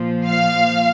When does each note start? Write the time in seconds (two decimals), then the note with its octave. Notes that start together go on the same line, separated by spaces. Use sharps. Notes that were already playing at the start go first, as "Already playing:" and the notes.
Already playing: A#2 F3
0.29 F5